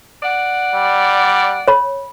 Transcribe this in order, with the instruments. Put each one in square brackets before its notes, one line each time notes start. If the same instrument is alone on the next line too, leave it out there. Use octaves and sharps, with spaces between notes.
[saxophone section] D5 F#5
[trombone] G3
[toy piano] C#5 B5